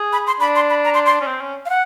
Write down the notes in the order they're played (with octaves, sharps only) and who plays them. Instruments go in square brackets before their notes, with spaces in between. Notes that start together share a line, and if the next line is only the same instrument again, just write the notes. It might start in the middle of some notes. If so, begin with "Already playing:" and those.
Already playing: [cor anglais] G#4
[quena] B5
C6
[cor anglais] D4 [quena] B5
[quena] C6
B5
A#5
C6
C6
[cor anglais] C#4
C4
C#4
[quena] F5
F#5